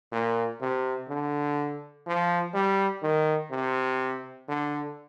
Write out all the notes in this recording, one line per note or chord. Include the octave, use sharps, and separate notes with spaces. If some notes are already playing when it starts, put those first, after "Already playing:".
A#2
C3
D3
F3
G3
D#3
C3
D3